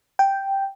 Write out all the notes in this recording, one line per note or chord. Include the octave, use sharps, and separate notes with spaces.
G5